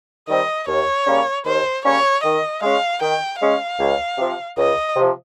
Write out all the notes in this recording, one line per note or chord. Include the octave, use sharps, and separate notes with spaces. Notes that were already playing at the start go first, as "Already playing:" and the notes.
D#3 G3 C4 D#5
D#2 C#5
C#3 G3 A#3 C#4
D#2 C5
C#3 G3 A#3 C#4 C#5
D#3 D#5
G#3 C#4 F5
D#3 G5
G#3 C#4 F5
C#2
C3 F3
C#2 D#5
C3 F3